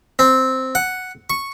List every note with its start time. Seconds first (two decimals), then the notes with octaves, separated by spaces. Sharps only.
0.19 C4
0.75 F#5
1.30 C#6